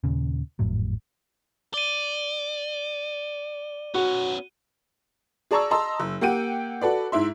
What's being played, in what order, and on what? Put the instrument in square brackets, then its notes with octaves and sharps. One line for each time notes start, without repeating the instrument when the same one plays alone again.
[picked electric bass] D#2 A#2 C#3
G#1 F2 A2 F#3
[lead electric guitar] D5 [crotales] D#7 G7
[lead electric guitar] B3 C#4 [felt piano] F#4
[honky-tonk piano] G#4 D5 A5 A#5 C#6 E6
D#5 A5 A#5 C6 E6
F#1
A#3 G4 F#5 G5 D#7
F#4 A4 B4 D5
G#2 E4 E5 C6